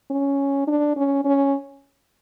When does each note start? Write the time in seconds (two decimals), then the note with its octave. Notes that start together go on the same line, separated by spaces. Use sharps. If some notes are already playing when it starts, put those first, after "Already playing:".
0.10 C#4
0.67 D4
0.96 C#4
1.25 C#4